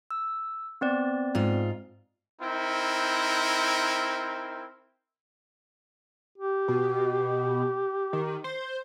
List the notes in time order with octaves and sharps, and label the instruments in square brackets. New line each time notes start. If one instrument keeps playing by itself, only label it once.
[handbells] E6
B3 C4 D5
[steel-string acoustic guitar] G#2 F4
[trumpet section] C4 D#4 E4 A#4
[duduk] G4
[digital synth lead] B2
D#3
C5